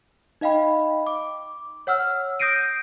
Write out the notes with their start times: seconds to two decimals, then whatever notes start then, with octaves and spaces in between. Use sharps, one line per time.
0.41 D#4 D#5 F5 G5 B5
1.07 D6
1.87 C#5 F#5 E6 F6
2.40 D#6 G6 A#6 C7 D7 D#7